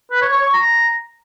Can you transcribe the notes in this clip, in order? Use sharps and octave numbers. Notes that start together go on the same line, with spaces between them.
B4
C#5
C#5
C#6
A#5